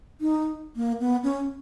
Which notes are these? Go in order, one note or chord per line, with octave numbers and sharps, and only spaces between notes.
D#4
A#3
B3
C#4